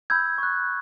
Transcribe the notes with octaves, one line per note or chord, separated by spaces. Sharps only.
B5 E6 G6 G#6
C#6 F#6